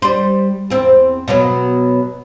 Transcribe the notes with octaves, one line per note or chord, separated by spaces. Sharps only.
G3 C5
E2 C4
B2 F#3 B3